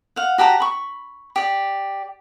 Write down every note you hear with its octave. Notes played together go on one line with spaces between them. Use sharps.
F5 F#5
F#4 G4 A5 A#5
B5 C#6
G4 D5